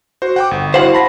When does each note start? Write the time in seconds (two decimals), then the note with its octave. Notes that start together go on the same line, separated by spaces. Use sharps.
0.22 F#4 C5
0.36 F#5 G5 D6
0.51 G1
0.74 E4 F#4 C5 F5 F#5
0.93 A5 B5 A#6